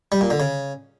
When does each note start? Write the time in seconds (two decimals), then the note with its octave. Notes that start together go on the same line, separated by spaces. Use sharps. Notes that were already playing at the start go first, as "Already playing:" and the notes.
0.12 G3
0.21 A#2
0.30 D3
0.40 C#3